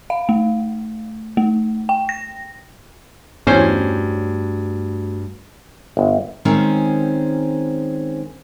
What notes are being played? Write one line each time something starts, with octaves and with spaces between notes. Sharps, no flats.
F5
A3
A3
G5
A#6
E2 G2 A3 C#4 F#4 C5
G1
D#3 G#3 C4 C#4